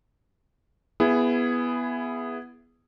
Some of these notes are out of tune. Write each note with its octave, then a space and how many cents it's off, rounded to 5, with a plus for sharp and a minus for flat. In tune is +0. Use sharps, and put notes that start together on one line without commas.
B3 +0 E4 +20 G#4 -5